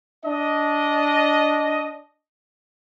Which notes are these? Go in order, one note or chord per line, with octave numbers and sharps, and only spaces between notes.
D4 D#5